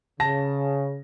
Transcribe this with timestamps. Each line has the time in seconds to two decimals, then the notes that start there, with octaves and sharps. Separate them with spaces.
0.20 C#3 A5 A#6